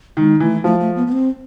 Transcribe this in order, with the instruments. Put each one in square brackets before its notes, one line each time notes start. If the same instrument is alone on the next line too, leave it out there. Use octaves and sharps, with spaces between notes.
[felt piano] D#3 [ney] G#3
[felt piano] E3 [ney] A3
[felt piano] F3 [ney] A3
[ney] A3
B3
B3
C4